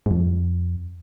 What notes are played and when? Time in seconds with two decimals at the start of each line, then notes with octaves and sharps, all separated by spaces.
0.06 G#2
0.11 F2